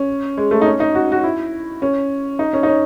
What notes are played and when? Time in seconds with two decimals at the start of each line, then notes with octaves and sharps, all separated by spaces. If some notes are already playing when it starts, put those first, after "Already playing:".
Already playing: C#4
0.37 G#3
0.51 A3
0.62 D#4
0.66 C#4
0.80 D#4
0.95 F#4
1.12 F#4
1.24 E4
1.82 C#4
2.39 D#4
2.53 C#4
2.63 D#4
2.68 C#4